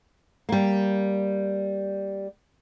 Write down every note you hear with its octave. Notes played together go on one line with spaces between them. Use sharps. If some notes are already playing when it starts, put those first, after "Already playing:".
G3 A#3